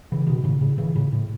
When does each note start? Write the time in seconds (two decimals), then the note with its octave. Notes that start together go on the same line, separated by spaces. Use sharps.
0.12 C#3 E3
0.27 B2 D#3
0.44 A2 C#3
0.61 A2 C#3
0.78 C#3 E3
0.95 A2 C#3
1.12 A2